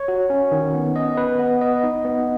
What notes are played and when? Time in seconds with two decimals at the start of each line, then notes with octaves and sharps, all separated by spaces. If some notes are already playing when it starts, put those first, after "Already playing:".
Already playing: C#5
0.08 F#4
0.30 C#4
0.52 D#3
0.74 B3
0.96 D#5
1.17 B4
1.39 B3
1.61 D#5
1.83 D#4
2.05 B3